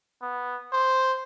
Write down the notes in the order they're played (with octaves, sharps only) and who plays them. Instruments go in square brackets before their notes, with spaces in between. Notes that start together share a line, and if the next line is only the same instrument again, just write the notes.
[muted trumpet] B3
C5